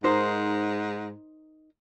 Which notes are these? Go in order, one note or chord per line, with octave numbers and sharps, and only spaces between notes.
G#2 D#4 A#4 C5